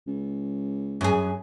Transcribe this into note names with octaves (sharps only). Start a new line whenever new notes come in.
C#2
F#2 G#4